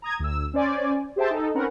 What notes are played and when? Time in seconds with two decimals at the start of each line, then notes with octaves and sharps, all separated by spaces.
0.02 A#5 D#6 G#6
0.19 D2 E6
0.54 C#4 C5 D5 G#5
1.16 G4 G#4 C5 E5 G5 A5
1.30 D#4 A4
1.55 C4 C#4 A#4 B4 F#5